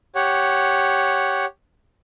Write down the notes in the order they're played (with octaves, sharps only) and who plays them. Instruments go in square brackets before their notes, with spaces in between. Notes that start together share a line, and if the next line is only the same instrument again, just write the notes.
[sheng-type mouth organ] G4 C#5 F#5